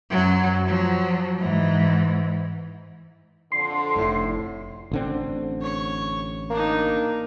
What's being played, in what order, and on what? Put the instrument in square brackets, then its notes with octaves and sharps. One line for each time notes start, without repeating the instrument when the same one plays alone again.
[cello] F#2 F#3
F3 F#3
G#2 E3
[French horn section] F2 D3 [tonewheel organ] C6
[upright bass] F1 [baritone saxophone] A2
[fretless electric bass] A1 D3 C4
[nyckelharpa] C#5 C#6
[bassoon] A#3 [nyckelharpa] D4 D#4